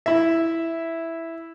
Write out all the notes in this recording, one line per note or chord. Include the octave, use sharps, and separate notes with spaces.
E4 E5